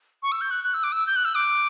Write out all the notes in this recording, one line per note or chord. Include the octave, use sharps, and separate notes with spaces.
C#6
E6
G6
F#6
F#6
E6
D6
E6
G6
F#6
E6
D6